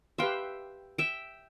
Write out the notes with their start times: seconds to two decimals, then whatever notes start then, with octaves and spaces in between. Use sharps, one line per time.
0.18 G4 B4 E5 F5 G5 C6
0.98 E5 G5